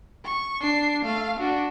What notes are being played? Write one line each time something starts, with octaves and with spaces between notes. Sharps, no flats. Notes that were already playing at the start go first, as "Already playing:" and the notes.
C#6
D4 C7
A3 F5
D4 F#4